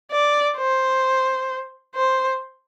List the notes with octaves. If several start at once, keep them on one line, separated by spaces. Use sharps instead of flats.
D5
C5
C5